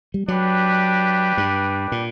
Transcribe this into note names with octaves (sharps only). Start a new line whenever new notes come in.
G3
F#3 D4 G4 B4
G2
A#2